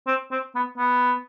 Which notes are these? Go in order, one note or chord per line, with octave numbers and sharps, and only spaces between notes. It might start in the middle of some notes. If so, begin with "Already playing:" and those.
C4
C4
B3
B3